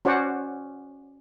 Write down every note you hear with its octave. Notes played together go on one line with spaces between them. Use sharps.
C#4 F#4 C5 D5 F#5